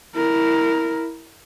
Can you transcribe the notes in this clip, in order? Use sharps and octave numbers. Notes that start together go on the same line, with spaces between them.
E4 A#4